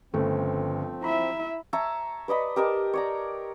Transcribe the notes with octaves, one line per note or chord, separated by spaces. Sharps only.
G1 C#3 F3 A3 C4
E4 E5 A#5 B5
C#5 E5 A5 A#5
B4 D5 D#5 B5
G4 A#4 D#5 A5
C#5 D5 A#5